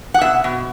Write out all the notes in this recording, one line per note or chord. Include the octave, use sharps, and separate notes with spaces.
F#5
B2 E5
B2